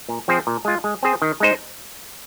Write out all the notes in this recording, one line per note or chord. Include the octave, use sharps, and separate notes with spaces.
A#2
F3 C4 G#4 C5
A#2
G#3 F4
G#3
C4 G#4 C5
D#3
G#3 D#4 C5